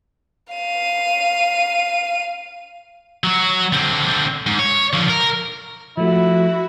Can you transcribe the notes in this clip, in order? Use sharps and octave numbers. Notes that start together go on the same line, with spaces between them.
F5 D#7
F#3 F#4
D3 C4
G#2
C#5
D3 F3
A#4
F3 A3 E4 F#4